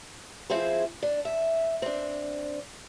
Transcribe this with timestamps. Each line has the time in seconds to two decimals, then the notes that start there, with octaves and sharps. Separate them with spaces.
0.50 F3 C4 E4 G#4 C5
1.02 D4
1.25 E5
1.82 C4 D4